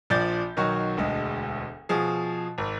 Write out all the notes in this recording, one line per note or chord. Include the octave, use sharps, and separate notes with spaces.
A#1 F3 D5 D6 G6 A6
B1 D#3 F#3 F#4 C#6
E1 D2 G#3
B2 F3 G#4
G#1